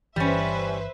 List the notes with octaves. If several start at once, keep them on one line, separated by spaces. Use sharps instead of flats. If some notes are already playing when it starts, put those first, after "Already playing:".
G1 E3 G3 C#4 B4 C5 E5